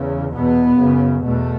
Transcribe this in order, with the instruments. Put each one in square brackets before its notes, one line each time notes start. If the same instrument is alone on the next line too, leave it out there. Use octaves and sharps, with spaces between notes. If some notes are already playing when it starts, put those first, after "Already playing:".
Already playing: [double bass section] E2 C#3
E2 B2 B3
F#2 C#3
E2 B2 A3